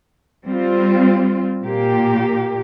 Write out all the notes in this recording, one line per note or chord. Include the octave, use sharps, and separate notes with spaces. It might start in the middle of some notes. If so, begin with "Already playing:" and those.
G3 C4 F4
A#2 A#3 G4